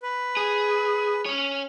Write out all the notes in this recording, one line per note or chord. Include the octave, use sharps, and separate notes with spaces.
B4
G#4
C#4 C#5